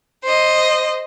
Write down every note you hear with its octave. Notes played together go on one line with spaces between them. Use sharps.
C5 D#5